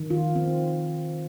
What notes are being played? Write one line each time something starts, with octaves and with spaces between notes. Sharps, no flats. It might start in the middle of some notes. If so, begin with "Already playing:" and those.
Already playing: D#3
F4
C4